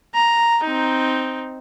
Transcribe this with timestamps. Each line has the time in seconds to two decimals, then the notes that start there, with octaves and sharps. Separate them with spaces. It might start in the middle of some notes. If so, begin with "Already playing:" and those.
0.14 A#5
0.63 C4 D#4